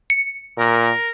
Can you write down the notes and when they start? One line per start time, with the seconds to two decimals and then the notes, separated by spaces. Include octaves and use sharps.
0.10 C#7
0.58 A#2 A#4